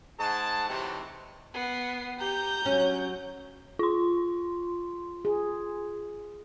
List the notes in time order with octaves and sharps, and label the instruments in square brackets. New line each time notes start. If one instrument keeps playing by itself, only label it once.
[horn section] G#2 G#4 F#5 A5
C3 E3 F#3 A3 C4 D#4
[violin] B3 C7
[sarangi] G4 [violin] A#5 G6
[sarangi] F#3 [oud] C#4
[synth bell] F4 C6
[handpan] G#4